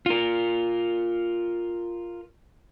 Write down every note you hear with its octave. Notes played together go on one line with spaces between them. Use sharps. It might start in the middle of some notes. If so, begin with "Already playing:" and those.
F4 A#4